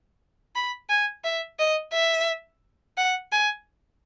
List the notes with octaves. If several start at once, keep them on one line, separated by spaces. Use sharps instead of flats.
B5
G#5
E5
D#5
E5
F#5
G#5